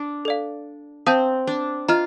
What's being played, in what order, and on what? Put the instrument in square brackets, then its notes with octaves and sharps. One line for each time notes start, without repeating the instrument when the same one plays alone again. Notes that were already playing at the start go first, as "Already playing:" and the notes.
Already playing: [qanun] D4
[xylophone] A4 D5 F5
[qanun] C4 [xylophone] F5 A5 D#6 G6
[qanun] D4
[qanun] F4 [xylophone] D#5 A#5 F6